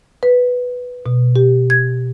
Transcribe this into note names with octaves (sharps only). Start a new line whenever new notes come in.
B4
B2
G4
G#6